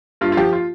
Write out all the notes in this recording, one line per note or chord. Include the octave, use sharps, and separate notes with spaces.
G2 F4
F4
F3 G4
F4